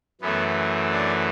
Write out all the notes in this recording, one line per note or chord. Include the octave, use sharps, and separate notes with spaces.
F#2 E3 A3 B3
D4